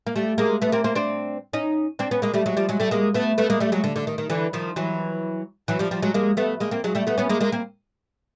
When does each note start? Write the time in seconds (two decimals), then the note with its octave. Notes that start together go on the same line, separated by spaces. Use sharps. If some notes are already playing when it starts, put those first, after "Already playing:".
0.07 A#3
0.16 G3 A3
0.38 G#3 A#3
0.62 A3 B3
0.72 A#3 C4
0.84 A#3 C4
0.95 C4 D4
1.53 C#4 D#4
1.99 C4 D4
2.11 B3 C#4
2.22 G#3 A#3
2.34 G3 A3
2.46 F#3 G#3
2.57 F3 G3
2.69 F#3 G#3
2.80 G3 A3
2.91 G#3 A#3
3.14 A3 B3
3.38 A3 B3
3.50 G#3 A#3
3.60 G3 A3
3.72 F#3 G#3
3.84 D3
3.96 D3
4.07 D#3
4.18 D#3
4.30 D3 E3
4.53 D#3 F3
4.76 E3 F#3
5.68 E3 F#3
5.79 F3 G3
5.91 F3 G3
6.02 F#3 G#3
6.14 G#3 A#3
6.37 A3 B3
6.60 G#3 A#3
6.71 A#3 C4
6.84 F#3 G#3
6.95 G3 A3
7.07 A3 B3
7.18 B3 C#4
7.29 G#3 A#3
7.40 G#3 A#3
7.52 A#3 C4